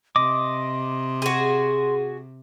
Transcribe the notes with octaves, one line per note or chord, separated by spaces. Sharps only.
C3 D#5 C6 D6
F#4 G#4